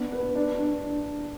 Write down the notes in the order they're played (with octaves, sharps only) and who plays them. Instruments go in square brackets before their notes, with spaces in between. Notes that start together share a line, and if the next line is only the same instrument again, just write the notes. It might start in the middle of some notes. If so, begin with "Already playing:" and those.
Already playing: [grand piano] B3 D4
B4
D4
D4